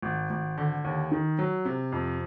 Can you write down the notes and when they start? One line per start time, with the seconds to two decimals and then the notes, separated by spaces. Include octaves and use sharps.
0.02 G#1
0.30 G#1
0.57 D3
0.84 D#2
1.11 D#3
1.39 F#3
1.65 C3
1.92 F2